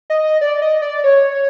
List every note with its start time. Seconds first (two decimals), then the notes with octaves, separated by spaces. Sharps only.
0.10 D#5
0.41 D5
0.62 D#5
0.82 D5
1.04 C#5